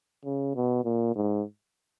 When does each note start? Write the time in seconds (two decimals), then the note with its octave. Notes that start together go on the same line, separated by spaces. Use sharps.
0.25 C#3
0.55 B2
0.85 A#2
1.16 G#2